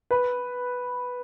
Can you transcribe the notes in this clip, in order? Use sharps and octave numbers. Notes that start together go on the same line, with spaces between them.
B4